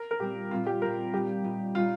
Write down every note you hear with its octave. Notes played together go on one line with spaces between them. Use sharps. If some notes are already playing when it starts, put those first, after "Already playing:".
Already playing: A#4
A#4
A#2 G3 C4 G4
A#2 G3 C4 F4
G4
A#2 G3 C4 A#4
A#2 G3 D#4 G4
A#2 G3 D#4
A#2 G3 D#4 F4